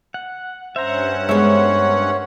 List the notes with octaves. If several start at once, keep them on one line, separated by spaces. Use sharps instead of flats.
F#5
G2 C#4 C5 E5 F#5 A#5
G#3 B3 A#4 C5 C#5 E5